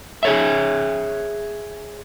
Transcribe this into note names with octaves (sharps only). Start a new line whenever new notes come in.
G#4 C#5 E5